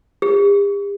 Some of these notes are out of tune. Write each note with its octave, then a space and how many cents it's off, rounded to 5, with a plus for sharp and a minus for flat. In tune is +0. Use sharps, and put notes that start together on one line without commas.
G4 +45